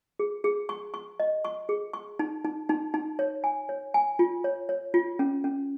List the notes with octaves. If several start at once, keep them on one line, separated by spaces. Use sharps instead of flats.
G#4
G#4
C#6
C#6
D#5
C#6
G#4
C#6
D#4
D#4
D#4
D#4
C#5
G#5
C#5
G#5
F4
C#5
C#5
F4
C#4
C#4